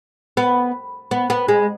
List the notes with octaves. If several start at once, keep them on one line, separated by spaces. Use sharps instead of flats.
B3
B3
B3
G#3